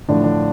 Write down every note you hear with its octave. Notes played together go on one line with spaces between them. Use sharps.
A2 D3 F3 A3 D4
D3 D4